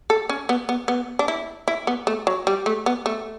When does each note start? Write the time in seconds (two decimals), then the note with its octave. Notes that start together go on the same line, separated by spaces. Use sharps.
0.10 A4
0.29 C#4
0.49 B3
0.69 B3
0.88 B3
1.19 D4
1.28 E4
1.68 E4
1.87 B3
2.07 A3
2.27 F#3
2.47 G3
2.66 A3
2.86 B3
3.06 A3